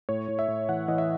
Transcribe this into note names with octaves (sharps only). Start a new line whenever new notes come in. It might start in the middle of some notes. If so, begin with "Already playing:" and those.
A2 C#5
A2
E5
A2
E3 F#5
E3 D#5
E5